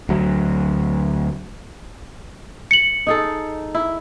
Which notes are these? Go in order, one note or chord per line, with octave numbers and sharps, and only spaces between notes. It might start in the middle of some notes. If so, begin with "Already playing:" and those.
D2 F#3
C#7 F#7
D#4 G#4 A4
E4